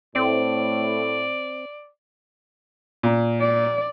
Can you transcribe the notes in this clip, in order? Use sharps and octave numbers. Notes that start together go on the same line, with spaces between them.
A2 C4 D5
A#2
D5